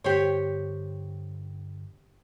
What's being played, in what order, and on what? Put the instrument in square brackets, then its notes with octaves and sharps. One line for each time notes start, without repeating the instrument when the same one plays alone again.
[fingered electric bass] G2 D3 [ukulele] G4 C5 C#5